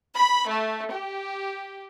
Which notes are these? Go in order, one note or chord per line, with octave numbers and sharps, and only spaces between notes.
B5
A3
G4